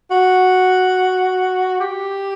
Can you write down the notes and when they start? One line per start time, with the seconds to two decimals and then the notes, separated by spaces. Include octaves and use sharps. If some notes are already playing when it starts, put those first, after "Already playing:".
0.11 F#4
1.80 G4